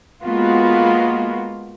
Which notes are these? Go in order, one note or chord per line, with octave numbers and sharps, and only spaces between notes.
G#3 A#3 B3 F4 F#4